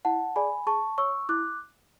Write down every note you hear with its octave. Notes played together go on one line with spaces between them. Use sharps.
E4 F#5 A5
G#4 D5 G#5 B5
G#4 A5 C#6
C#5 C#6 E6
E4 D6 F#6